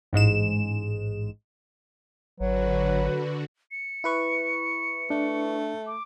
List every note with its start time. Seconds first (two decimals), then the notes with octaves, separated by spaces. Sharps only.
0.13 A1 G#2 G#3 E7
2.40 G#1 D3 F#3 F#4 B4
3.71 C#7
4.04 E4 B4 C#6
5.10 A3 D4
5.87 D6